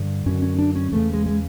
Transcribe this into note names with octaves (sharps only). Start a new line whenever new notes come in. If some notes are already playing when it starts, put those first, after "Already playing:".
Already playing: G2 D3
F#2 D3 C#4
C#4
D4
C#4
E2 C#3 A3
G#3
G#3